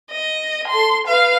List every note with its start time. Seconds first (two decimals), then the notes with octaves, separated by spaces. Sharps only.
0.11 D#5
0.68 A4 C6
1.07 B4 F5